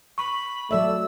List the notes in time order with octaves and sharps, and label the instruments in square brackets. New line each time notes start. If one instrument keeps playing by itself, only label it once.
[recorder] B5 [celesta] C#6
[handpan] F#3 D5 E5 [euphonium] A3 [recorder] E6